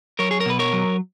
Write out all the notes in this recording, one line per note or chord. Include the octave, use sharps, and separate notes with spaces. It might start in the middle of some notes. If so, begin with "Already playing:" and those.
F#3 A#4 C#5
G#4
A#4
B2 B4
A#4 C#5
F#3